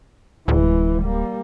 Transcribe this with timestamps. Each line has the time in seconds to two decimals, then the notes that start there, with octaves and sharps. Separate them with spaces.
0.48 D1 E3 G#3
1.03 G3 A#3